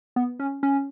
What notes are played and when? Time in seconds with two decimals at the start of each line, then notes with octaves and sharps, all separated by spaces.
0.16 B3
0.40 C#4
0.63 C#4